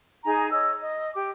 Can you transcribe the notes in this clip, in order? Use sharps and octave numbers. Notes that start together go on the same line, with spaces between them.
D#4 G#4 G#5 A#5
C#5 D#5 E6
D#5
G4 D6